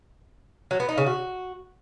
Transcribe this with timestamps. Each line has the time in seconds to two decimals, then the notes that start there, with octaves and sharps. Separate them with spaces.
0.71 F#3
0.80 B3
0.89 D#4
0.98 C#3
1.06 F#4